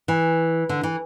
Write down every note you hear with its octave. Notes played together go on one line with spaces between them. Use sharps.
E3
D3
E3